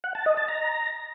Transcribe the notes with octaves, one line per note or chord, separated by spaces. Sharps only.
F#5
A5
D#5
A5
A#5